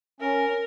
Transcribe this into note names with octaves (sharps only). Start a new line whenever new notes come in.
C#4 A#4